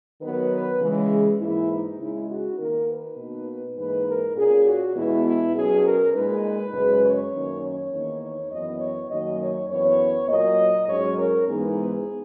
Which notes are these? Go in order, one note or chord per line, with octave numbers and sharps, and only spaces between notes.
D#3 F#3 B3 B4
B4
C#3 E3 G#3
G#2 E3 A#3 E4
D#4
C#3 G#3 D#4 E4
F#4
D#3 A#3 D#4 A#4
B4
B2 A#3 D#4
G#2 E3 A#3 D#4 B4
A#4
A#2 A#3 C#4 G#4
F#4
E2 B2 G#3 B3 E4
E4
B2 F#3 C#4 G#4
A#4
A#2 G#3 D#4 B4
F#2 C#3 G#3 C#4
C#5
F#2 D#3 A#3 C#4
C#5
E2 D#3 A#3 D#4
C#5
F#2 E3 B3 D#5
C#5
F#2 D#3 F#3 A#3 D#5
C#5
F#2 E3 B3 C#5
A#2 F#3 A#3 D#5
G#2 F#3 C#4 C#5
A#4
G#2 E3 G#3 B3 D#4 G#4